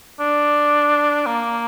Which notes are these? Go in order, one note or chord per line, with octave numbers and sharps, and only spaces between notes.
D4
A#3